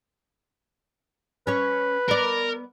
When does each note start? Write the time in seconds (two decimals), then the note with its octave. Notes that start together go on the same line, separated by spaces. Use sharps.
1.47 C#4 B4 C#5
2.08 B3 A#4 D5